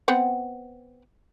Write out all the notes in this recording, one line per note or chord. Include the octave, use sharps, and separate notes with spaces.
B3 C4 F#5